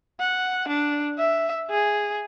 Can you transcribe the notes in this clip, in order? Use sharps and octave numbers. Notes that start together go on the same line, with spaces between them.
F#5
D4
E5
G#4